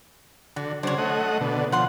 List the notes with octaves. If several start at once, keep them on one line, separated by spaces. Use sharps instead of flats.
D3 F#4
C#3 F#3 D4 C5 C#5
A3 D#5 F#5
B2 D3
F3 F#5 C6